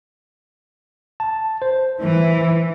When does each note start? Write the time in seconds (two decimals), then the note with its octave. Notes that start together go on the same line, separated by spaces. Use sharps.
1.20 A5
1.62 C5
2.03 E3